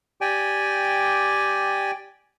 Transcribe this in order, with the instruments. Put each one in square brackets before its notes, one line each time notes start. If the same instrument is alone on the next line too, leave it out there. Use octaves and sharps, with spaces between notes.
[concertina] G4 D5 G5 G#5